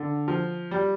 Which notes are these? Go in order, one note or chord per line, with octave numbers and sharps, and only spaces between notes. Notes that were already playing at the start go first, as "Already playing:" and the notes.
Already playing: D3
F3
G3